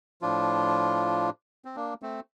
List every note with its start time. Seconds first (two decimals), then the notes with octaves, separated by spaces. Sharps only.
0.22 A2 F3 D4 F4
1.65 C4
1.76 A#3 D4
2.02 A3 C4